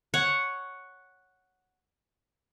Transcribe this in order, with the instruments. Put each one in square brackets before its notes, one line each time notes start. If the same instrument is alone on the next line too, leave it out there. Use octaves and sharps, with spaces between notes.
[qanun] C#5 F#5